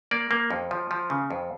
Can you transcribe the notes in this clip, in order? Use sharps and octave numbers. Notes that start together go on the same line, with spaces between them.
A#3 D5
A#3
F2
F3
F3
C#3
F2